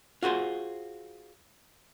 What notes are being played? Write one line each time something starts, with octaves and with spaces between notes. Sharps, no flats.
F4 F#4 G#4 C5